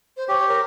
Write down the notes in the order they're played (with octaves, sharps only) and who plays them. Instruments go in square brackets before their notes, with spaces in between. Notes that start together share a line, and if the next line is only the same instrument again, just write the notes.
[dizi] C5
[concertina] G4 [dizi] C#5
[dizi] A#4